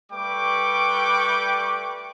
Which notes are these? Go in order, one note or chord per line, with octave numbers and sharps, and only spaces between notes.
G3 A3 B4 G5 C#6 D6